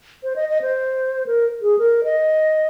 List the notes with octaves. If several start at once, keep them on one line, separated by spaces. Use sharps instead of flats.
C5
D#5
D#5
C5
A#4
G#4
A#4
D#5